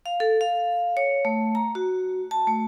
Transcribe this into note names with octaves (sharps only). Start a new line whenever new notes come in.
F5
A4
F5
C#5
A3
A#5
F#4
A5
A3